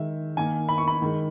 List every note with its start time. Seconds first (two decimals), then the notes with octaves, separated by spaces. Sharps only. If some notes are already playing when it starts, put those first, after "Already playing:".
Already playing: D#3 G#3 E5
0.37 D#3 A#3 G#5
0.69 B5
0.78 C#6
0.88 B5
1.02 D#3 G#3